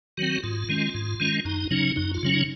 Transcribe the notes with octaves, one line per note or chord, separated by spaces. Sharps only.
D#3 F#3 C4 F#4
G#2 F4
D#3 G#3 C#4
G#2
D#3 G#3 C#4
F#2 D#4
C#3 F#3 C#4 D#4
F#2 D#4
F4
C#3 F#3 C#4
D#4